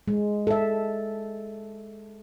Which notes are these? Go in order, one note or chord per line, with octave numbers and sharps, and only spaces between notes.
G#3
A4 E5